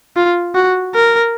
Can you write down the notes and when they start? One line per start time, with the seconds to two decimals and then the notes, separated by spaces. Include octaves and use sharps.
0.16 F4
0.55 F#4
0.95 A#4